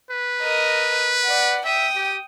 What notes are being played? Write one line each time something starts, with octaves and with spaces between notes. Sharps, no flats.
B4
A#4 D#5
D5 F#5
E5 G5 D#6
G4